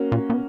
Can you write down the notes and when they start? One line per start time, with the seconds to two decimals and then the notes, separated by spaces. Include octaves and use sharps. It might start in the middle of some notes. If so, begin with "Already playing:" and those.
Already playing: A#3 C#4 F#4
0.12 A#2
0.30 A#2
0.34 B2